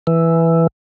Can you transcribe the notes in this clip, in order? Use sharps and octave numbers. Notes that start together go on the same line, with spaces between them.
E3